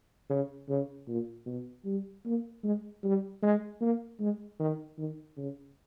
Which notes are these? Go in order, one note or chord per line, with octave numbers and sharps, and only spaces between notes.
C#3
C#3
A#2
B2
G3
A#3
G#3
G3
G#3
A#3
G#3
D#3
D#3
C#3